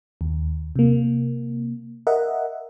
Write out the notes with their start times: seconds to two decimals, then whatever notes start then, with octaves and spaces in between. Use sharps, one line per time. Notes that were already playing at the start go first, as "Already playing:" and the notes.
0.21 D#2
0.76 C3 A#3
2.07 A#4 D#5 E5 F#5